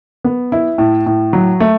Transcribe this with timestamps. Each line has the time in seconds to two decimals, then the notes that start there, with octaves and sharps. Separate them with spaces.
0.24 B3
0.52 E4
0.78 A2
1.06 A2
1.33 F#3
1.60 A3